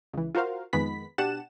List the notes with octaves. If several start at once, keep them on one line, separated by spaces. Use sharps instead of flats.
C#2 E3
F4 F#4 A#4 C5 F5
F2 D#3 G#3 B3 B5 B6
B2 D4 G4 F#5 A5 E7